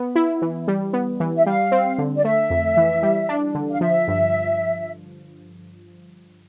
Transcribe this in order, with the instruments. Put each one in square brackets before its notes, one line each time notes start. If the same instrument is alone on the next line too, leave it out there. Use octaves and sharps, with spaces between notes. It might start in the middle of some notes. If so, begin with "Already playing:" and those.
Already playing: [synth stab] B3
E4
E3
G3
B3
E3
[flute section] E5
[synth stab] G3 [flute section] F5
[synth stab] C4
D3
[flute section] D5
[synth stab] A3 [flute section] E5
[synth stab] F2
E3
G3
D4
D3
[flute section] F5
[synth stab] F3 [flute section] E5
[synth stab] G2